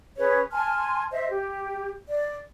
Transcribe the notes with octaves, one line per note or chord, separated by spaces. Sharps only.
C#4 G#4 B4 C#5
G#5 A5 C6 F6
C5 D#5 E5
G4
D5